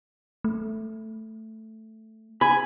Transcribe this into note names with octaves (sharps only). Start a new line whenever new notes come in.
A3
G#5 B5